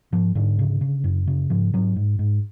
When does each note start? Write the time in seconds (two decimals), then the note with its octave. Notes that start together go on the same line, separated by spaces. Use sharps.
0.12 G#2 F3
0.35 G#2 D3
0.59 C#3
0.81 C#3
1.04 F#2
1.27 C#3
1.50 G#2 F3
1.73 G#2 F#3
1.96 G#2
2.19 G#2